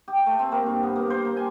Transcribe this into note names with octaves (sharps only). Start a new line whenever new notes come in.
G4
A3
C4
A#3
G2
B3
A#3
C5
A#3
G#5